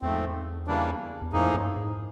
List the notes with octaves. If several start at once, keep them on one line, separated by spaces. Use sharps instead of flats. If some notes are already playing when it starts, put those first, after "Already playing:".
E2 G#2 F3 A3 C4
C#3 E3 G3 A#3 D4
E2
F2 A2 F3 A#3 D#4 G#4
G2
G#2